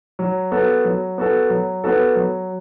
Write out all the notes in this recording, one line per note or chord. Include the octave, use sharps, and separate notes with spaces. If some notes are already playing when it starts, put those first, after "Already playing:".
F#3
B3 F#4 A4
F#3
B3 F#4 A4
F#3
B3 F#4 A4
F#3